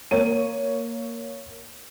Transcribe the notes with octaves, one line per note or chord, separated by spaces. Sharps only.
A#3 C#5 D#7